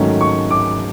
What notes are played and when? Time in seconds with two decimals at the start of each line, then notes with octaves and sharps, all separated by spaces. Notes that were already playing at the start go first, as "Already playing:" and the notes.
Already playing: G#2 D#3 F#3 A3 C#4
0.21 C#6
0.51 D6